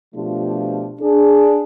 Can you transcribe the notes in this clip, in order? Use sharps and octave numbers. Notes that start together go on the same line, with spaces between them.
B2 F3 A3 D4 F4 G4
D4 G#4